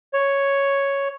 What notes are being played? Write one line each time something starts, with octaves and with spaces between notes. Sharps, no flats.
C#5